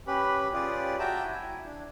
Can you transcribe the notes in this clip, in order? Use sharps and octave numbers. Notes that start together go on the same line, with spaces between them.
C#4 G4 B4 B5
C#4 F4 G4 G#4 B4 D5
F#4 E5 G5 A5 A#5 D6
E4 G#5
D4